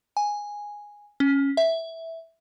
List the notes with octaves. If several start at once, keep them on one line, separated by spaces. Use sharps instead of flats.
G#5
C#4
E5